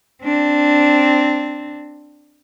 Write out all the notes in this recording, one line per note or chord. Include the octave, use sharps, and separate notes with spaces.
C4 D4